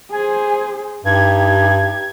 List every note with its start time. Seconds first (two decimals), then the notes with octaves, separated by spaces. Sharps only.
0.12 G#4 C5 G#5
1.05 G2 D#4 G4 G#6